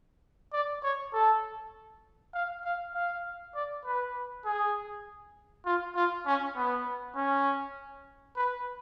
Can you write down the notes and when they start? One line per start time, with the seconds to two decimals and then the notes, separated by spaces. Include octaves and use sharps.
0.53 D5
0.83 C#5
1.13 A4
2.34 F5
2.65 F5
2.95 F5
3.55 D5
3.85 B4
4.45 G#4
5.66 F4
5.95 F4
6.26 C#4
6.56 B3
7.16 C#4
8.37 B4